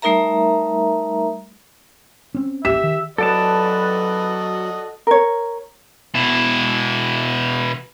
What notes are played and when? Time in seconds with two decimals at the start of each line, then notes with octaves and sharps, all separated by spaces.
0.02 G3 A3 D#4 A#4 E5 A#5
2.35 C4 C#4
2.65 A1 D#2 G4 E5 B6 E7
2.83 D#3
3.18 A1 F#3 F#4 A4 B4 D5 D#5 A5
5.07 A#4 C#5
6.14 B2 E4